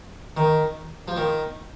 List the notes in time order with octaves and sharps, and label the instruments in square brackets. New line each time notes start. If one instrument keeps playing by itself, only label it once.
[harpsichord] D#3
F3
D#3